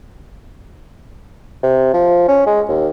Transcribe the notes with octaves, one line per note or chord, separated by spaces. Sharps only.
C3
F3
C#4
G#3
D#2